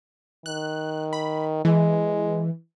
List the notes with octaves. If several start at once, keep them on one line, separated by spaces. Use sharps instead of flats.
D#3 F#6
B5
E3 G#3